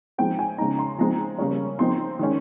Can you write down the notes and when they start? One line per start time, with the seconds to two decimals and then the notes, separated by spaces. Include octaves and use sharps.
0.18 F3 G#3 C4 D#4 G5
0.39 G#5
0.58 C#3 G#3 D#4 A#5
0.79 C6
0.98 F3 G#3 C4 D#4 A#5
1.39 C#3 G3 A#3 C#4
1.79 F3 C4 D#4 C6
2.19 D#3 G#3 C#4